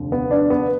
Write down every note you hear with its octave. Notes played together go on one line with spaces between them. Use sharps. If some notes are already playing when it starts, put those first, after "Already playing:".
Already playing: F1 D#2 D3
B3
D4
B3